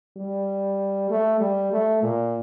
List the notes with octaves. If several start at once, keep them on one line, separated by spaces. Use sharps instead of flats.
G3
A3
G3
A3
A#2